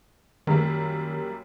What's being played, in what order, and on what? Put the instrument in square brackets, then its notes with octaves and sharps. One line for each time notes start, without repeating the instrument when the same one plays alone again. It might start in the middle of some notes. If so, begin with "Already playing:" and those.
[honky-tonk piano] F#2 G3 A#3 [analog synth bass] D#3